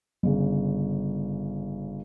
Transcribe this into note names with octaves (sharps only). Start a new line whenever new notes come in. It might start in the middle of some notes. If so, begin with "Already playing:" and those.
G1 C#3